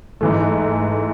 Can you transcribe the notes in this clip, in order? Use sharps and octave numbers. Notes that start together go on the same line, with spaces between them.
G#2 E3 A3